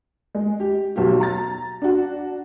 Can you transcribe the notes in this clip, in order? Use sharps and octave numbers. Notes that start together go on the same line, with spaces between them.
G#3
G4
B1 F#4 G4
A#5 A6
D4 F#4